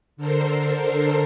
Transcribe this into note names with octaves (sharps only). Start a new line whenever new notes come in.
D3 A4 A#4 C5 C7